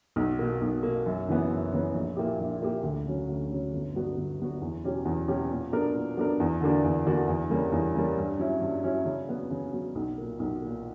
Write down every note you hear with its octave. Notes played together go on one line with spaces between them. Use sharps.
B1
B2 A#3
B1
B2 A#3
F#2
C#3 E3 B3
F#2
C#3 E3 B3
A#1
A#2 A#3 E4 G4
A#1
A#2 A#3 E4 G4
D2
C#3 F#3 C#4
D2
C#3 F#3 C#4
G1
G2 F#3 B3 F#4
G1
G2 F#3 B3 F#4
E2
B2 F#3 C#4 G4
E2
B2 F#3 C#4 G4
A#2
F#3 B3 D4 A#4
A#2
F#3 B3 D4 A#4
E2
D3 A#3 D4 F#4
E2
D3 A#3 D4 F#4
E2
C#3 G3 A#3
E2
C#3 G3 A#3
G2
F#3 C#4 E4
G2
F#3 C#4 E4
C#3
F#3 B3
C#3
F#3 B3
B1
A#2 A#3
B1
A#2 A#3